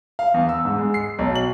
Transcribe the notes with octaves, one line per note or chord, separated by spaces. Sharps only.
F5
E2
E6
G#2
G#3
C7
B1
F#7